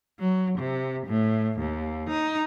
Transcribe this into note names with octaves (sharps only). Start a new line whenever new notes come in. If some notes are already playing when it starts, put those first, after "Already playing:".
F#3
C3
A2
D#2
D#4